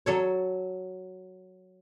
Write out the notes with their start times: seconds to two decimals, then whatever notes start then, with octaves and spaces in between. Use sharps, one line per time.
0.06 F#3 A4 C#5